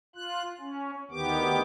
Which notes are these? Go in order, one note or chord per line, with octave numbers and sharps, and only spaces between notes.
F4 F#6
C#4
D2 D#3 B3 G4 D6